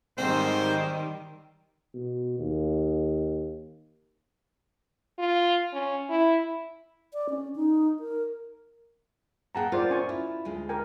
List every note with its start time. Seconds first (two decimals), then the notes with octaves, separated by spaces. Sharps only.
0.18 G#2 D#3 G3 C4 C5
1.94 B2
2.38 D#2
5.19 F4
5.73 C#4
6.10 E4
7.13 D5
7.30 C#4
7.56 D#4
8.00 A#4
9.55 A#3 G#4 F#5 G5 A5 A#5
9.72 A3 F4 A#4 C5 D5
9.90 C#4 G#5 C#6
10.09 E4 F4
10.45 D2 G#3 F4
10.69 A#4 G5 G#5